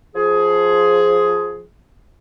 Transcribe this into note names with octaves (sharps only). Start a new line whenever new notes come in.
F3 G#4